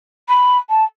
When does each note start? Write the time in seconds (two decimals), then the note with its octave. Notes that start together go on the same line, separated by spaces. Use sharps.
0.28 B5
0.69 A5